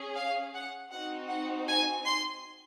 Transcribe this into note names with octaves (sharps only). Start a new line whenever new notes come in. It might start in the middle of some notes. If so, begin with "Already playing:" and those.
Already playing: C#4 G#4
F5
F#5
C4 D#4 F#4 F#5
F#5
G#5
C6